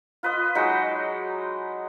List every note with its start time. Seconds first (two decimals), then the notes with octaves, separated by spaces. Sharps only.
0.23 F4 B4 D#5
0.55 F#3 G#3 D#4